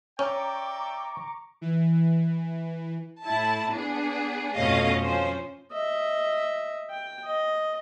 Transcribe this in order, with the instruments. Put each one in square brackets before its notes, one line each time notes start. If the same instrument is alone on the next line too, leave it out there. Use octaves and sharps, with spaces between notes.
[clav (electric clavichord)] C#4 [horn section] D5 E5 G5 [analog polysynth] A#5 C#6 D6
[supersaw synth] E3
[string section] A2 E4 A5
B3 D4 G#4
F2 B2 A3 C#4 D#5 F5
F3 C#4 C5
[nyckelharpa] D#5 E5
G5
D#5